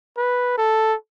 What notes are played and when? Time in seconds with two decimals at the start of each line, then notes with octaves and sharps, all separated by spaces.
0.17 B4
0.58 A4